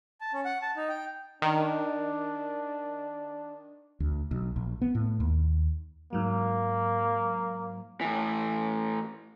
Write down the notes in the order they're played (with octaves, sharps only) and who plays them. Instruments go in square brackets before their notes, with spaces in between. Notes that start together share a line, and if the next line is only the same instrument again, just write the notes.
[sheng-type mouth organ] A5
C#4
F#5
A5
D#4
G5
[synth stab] D#3 [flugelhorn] D4
[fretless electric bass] D2
B1
A#1
B3
A2
D#2
[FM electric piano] G#2 F#3 [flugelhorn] A#3
[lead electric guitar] A2 E3